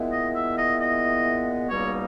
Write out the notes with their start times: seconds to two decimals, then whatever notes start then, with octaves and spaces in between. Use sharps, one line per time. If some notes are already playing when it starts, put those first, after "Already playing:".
Already playing: A#2 G#3 B3 E4
0.11 D#5
0.35 E5
0.57 D#5
0.80 D#5
1.69 C#2 B2 G3 A#3 D#4 C#5